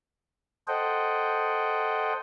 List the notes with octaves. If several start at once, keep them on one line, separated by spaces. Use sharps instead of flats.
A4 C5 D#5 F#5 G5